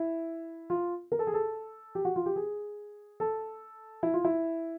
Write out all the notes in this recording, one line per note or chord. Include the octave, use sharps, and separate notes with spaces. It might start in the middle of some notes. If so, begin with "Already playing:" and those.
Already playing: E4
F4
A#4
A4
G#4
A4
G4
F#4
F4
G4
G#4
A4
E4
F4
E4